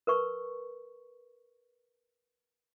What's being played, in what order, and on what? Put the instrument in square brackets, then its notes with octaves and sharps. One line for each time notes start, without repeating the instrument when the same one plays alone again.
[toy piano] A#4 B4 C#6